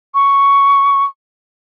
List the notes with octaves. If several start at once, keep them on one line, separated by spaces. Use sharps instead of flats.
C#6